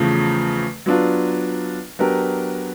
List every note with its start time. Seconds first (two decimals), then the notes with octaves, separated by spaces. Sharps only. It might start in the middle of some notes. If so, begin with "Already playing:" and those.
Already playing: E2 C#3 F3 A3
0.86 F#3 B3 D4 F4
1.99 F#3 B3 D4 G4 A#4